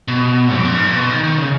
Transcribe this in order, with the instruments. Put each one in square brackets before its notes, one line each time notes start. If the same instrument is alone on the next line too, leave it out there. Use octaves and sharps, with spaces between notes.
[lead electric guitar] B2
F2
F#2
G#2
A#2
B2
D#3
D#3
C#3